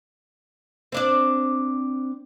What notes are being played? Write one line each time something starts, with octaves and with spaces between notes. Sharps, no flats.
C4 D4 D5